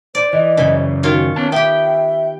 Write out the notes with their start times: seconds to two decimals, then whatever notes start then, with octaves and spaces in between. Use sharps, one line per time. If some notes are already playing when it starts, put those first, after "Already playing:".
0.15 C5 D5
0.33 E3 D#5
0.57 F#2 C#3 E3
1.03 D#3 F4 F#4 C#5
1.36 B3 C#4 A5
1.52 B3 G4 E5 G5